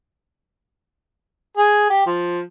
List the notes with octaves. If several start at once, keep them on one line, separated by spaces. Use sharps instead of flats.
G#4
G4
F3